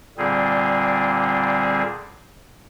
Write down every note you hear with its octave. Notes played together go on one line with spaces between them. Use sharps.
A#2 D3 G3 C4 G#4